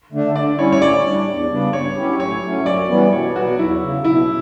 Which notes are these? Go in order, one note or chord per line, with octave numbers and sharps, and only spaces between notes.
D3 A3 D4
D3 D5
G3 C#4 E4 C#5
C#5
A2 D5
G3 D4
E2
C#3 G3 B3 D4
G2 C#5
F#3 C#4 E4 G4
A2 C#5
F#3 A3 C#4
F#2 D5
E3 G3 B3
B2 C#5
F#3 B3 F#4
E2 E4
C#3 F#3
B2 E4